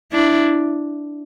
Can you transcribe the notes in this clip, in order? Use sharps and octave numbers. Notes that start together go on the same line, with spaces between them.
D4 E4